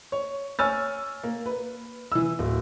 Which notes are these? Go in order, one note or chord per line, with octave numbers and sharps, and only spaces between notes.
C#5
C#5 G#5 E6 F6 A6
A#3
B4
E3 E6
D1